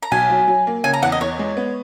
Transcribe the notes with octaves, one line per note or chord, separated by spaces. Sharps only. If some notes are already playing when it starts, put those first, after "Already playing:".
A#5
B1 G#5
F#3
F#3
A#3
C#3 G#5
A#5
E2 F#5
D#5
E2 C#5
G#3
B3